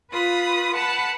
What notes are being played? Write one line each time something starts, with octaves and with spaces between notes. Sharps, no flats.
F4 B4 B5 D#6
B4 F#5 A5 B5